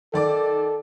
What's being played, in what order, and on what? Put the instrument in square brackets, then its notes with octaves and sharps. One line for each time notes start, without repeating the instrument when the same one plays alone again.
[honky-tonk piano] D#3 D5 D6 [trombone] A4